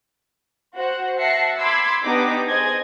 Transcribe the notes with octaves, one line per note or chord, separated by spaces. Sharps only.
F#4 C5 F#5
E5 F#5 A5 A#6 C7 C#7
B5 C6 D6 E6 G#6 C7
B3 D4 D#4 G4 D6
G#4 C5 D#5 G#5 G#6